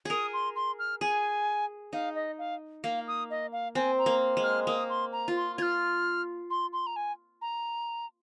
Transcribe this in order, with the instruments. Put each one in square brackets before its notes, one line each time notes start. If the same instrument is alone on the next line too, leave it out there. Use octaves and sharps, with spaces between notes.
[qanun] G#4 A#4 [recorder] D#6
[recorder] C6
C6
F6
[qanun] G#4 [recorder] G#5
[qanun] D#4 [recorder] F5
[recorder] D#5
F5
[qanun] A#3 [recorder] F5
[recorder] D#6
D#5
F5
[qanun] C4 [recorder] G#5
[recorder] A#5
[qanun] A#3
G#3
[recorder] F6
[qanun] A#3 [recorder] D#6
[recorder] C6
A#5
[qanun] F4
[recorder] C6
[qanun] F4 [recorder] F6 G#6
[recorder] C6
C6
A#5
G#5
A#5